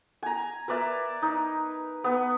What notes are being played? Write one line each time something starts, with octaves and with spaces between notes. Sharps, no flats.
G#5 A#5
A#4 B4 D5 E5
D#4
B3